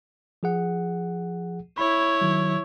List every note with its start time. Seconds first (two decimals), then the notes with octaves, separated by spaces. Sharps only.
0.43 F3 G#4 F#5
1.78 E4 C#5 B5
2.21 D#3 F#3